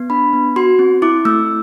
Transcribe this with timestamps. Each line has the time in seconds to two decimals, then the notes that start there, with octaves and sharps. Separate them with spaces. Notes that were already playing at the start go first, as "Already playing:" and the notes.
Already playing: B3
0.10 D4 B5
0.33 B3
0.56 F#4 C6
0.79 C4
1.02 E4 D6
1.25 A3 E6